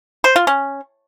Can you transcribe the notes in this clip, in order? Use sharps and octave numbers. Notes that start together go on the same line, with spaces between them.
C5
F4
C#4